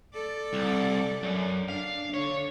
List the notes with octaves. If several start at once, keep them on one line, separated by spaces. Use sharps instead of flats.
A4 D5
C2
F#2
D4 F5
D3 D4 C#5